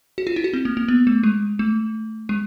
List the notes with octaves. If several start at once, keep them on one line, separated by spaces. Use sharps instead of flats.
F#4
F4
E4
F#4
C4
A#3
A#3
B3
A3
G#3
A3
G#3